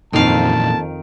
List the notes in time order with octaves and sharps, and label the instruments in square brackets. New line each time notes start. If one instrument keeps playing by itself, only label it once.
[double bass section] F2 [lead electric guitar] A#2 E3 [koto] D#3 F5 [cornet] A5